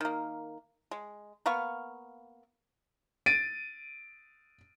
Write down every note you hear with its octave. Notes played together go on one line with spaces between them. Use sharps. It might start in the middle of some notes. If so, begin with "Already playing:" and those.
D#3 A#3
G#3
A#3 B3 F5 C#6
A6 D7 D#7